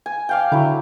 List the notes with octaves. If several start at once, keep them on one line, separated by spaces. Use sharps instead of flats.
G#5
D5 F5 G5
D3 F#3 E4